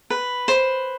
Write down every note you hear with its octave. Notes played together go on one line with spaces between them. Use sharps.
B4
C5